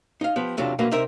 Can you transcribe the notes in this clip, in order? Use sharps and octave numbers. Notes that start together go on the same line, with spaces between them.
D#4 F5
F3 B3 G4
E2 C3 F#3 D4 F4 A4
D2 B2 F#3 A#3 B4 F5
C3 C4 D#4 A#4 E5